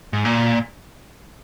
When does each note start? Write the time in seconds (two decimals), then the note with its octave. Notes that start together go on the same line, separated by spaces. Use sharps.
0.13 G#2
0.25 A#2